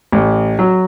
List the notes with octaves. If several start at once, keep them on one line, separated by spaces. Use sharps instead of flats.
A1
F#3